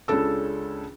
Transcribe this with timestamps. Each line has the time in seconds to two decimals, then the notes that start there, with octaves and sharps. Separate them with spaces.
0.08 C#2 C#3 C#4 D4 A4 E6